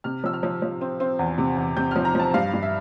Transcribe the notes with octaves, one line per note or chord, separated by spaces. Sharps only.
C3 F6
F3 E6
F6
F3
F3
C4
C4
E2
C3
E2
C3 G6
F3 F6
A#5
F3 A5
G2 F5
G2
E5